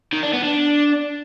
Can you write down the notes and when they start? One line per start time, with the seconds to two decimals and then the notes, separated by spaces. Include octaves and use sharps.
0.13 D#3
0.23 D4
0.33 B3
0.43 D4